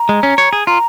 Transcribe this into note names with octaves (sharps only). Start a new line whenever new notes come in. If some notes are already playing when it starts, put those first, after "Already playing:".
Already playing: A#5
G#3
C#4
C#5
G#4
F4 A#5